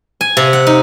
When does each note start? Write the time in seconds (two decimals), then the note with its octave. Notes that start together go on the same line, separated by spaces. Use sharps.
0.21 G#5
0.37 C3
0.53 F#5
0.67 D#4